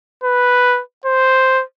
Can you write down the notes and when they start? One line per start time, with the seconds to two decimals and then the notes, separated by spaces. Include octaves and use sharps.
0.24 B4
1.06 C5